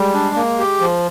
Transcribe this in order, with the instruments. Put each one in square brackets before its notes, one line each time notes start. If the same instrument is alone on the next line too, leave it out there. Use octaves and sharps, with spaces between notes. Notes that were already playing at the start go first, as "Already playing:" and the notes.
Already playing: [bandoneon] G3 [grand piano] G#3
[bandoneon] D4
A#3
G4
F3